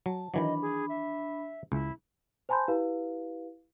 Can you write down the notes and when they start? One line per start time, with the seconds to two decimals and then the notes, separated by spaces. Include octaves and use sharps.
0.06 F#3 A5
0.34 D#3 E3 F#3 D4 D#5 B5
0.62 G#4
0.89 E5
1.72 C#2 E4
2.49 C5 G#5 A5 B5 C6 G6
2.68 E4 G4 B4 F5